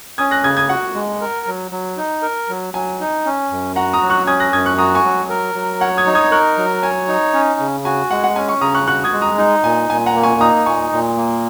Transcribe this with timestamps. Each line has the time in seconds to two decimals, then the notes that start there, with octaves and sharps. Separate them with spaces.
0.18 C#4 D#6 G#6
0.31 F#6 A#6
0.44 C#3 D#6 G#6
0.57 D#6 G#6
0.69 F#4 F#5
0.95 G#3
1.21 A#4
1.47 F#3
1.71 F#3
1.97 D#4
2.22 A#4
2.49 F#3
2.74 F#3 G#5
3.00 D#4
3.26 C#4
3.51 F#2
3.76 F#4 F#5 A#5
3.93 A#5 D#6
4.02 F#3
4.10 C#6 F#6
4.27 C#4 D#6 G#6
4.40 F#6 A#6
4.53 F#2 D#6 G#6
4.66 C#6 F#6
4.78 F#4 A#5 D#6
4.95 G#5 C#6
5.04 F#3
5.29 A#4
5.55 F#3
5.80 C#5 F#5
5.97 D#6 G#6
6.06 D#4
6.15 D#6 G#6
6.31 A#4 C#6 F#6
6.58 F#3
6.82 C#5 G#5
7.08 D#4
7.34 C#4
7.60 C#3
7.85 F#4 G#5
8.11 G#3 F#5
8.24 F#5
8.36 C#4 G#5
8.48 G#5 C#6
8.61 C#3 A#5 D#6
8.74 C#6 F#6
8.87 F#4 C#6 F#6
9.04 D#6 G#6
9.12 G#3
9.22 A#5 D#6
9.38 D#4
9.64 A#2 G#5
9.90 A#2 G#5
10.06 F#5 A#5
10.15 A#3
10.23 G#5 C#6
10.40 D#4 A#5 D#6
10.66 A#2 G#5 C#6
10.92 A#2
11.17 A#3